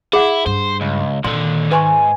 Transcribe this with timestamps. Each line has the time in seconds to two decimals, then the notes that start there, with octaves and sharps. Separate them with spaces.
0.13 E4 G#4 F#5
0.46 G2 C5
0.81 C#2
1.24 A#2 D3 D#3 C6
1.71 G#2 B4 G#5 C6 C#6